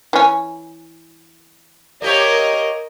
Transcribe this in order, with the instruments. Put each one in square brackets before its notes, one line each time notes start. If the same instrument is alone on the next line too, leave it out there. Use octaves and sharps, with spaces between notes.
[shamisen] E3 C#4
[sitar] A#3 G4 C#5 [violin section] A#4 D#5